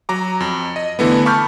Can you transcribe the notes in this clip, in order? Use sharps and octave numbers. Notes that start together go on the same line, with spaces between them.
F#3 A#5 D6
F2
D#5
D3 E3 A3 B3
A5 B5 C#6 D6 F6 G6